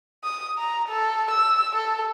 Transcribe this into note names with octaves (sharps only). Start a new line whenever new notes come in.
D#6
A#5
A4
E6
A4